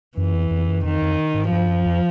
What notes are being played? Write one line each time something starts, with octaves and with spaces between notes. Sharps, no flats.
F#2 E3
F2
F2
F#2
F2 D#3
F2
G#2
G2 F3
F#2
F2